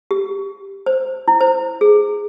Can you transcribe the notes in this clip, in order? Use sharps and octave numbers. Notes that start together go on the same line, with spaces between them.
G4
C5
E4
C5
G#4